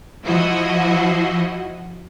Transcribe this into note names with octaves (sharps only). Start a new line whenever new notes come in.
F3 E4 F#4 D#5